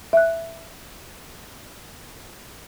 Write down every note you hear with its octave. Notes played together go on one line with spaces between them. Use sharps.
E5 F#6